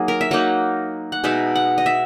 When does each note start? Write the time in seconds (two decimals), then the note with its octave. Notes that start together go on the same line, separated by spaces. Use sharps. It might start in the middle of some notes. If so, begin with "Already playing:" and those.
Already playing: F#3 A#3 D#4 G#4
0.08 A#4
0.21 E5
0.31 F#3 A#3 D#4 F#5
1.12 F#5
1.24 B2 G#3 D#4 E5
1.56 F#5
1.78 D#5
1.86 E5